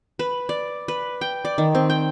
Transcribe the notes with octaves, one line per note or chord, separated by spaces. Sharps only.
B4
D5
B4
G5
D5
D#3
C4
G5